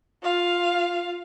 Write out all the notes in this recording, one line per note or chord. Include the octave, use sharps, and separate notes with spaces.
F4 F5